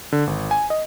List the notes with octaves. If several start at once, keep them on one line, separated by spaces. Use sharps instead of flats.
D3
G#1
G#5
D#5